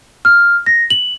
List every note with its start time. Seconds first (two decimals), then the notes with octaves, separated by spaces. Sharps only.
0.25 F6
0.66 A#6
0.90 F#7